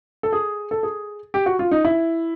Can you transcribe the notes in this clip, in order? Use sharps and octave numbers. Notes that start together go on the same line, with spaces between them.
A4
G#4
A4
G#4
G4
F#4
F4
D#4
E4